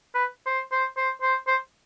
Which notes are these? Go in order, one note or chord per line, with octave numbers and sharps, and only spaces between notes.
B4
C5
C5
C5
C5
C5